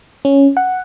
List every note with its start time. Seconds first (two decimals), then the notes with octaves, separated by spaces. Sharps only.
0.25 C#4
0.57 F#5